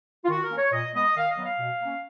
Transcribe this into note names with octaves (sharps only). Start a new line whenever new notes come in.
F4
D#3 F#4
A#4
A#3 C#4
C#5
A#2 D#5
G#3 B3 D#5
D#3 F5
D#5
F#3 B3
F5
B2
A#3 C#4